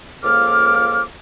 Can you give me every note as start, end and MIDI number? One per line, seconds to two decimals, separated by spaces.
0.23 1.04 37
0.23 1.04 53
0.23 1.04 58
0.23 1.04 69
0.23 1.04 86
0.23 1.04 89